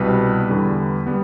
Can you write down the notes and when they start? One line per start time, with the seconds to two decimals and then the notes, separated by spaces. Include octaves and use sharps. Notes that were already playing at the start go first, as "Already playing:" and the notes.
Already playing: C2 B2 G3 B3 B4
0.49 E2 D3 G3
1.06 G3 B3